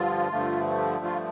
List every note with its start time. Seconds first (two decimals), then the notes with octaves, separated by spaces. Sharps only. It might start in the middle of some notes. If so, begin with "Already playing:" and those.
Already playing: G2 D3 F3 F4
0.31 G2 D3 F3 A3
1.05 F4